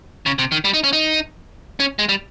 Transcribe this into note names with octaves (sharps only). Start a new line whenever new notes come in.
C#3
C3
D#3
G3
D#4
C#4
D#4
C#4
G#3
G3